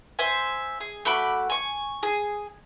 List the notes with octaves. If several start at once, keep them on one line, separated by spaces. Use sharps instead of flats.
C5 E5 G#5
G#4
A3 F#4 B5 D6
G#5 C#6
G#4